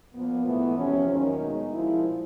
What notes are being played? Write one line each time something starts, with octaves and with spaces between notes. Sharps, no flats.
A#2 F3 A#3 B3
G#2 E3 A3 B3
E2 C3 F3 C#4
D#2 D#3 F#3 A#3 C#4
B2 G#3 D#4
A#2 F3 G#3 E4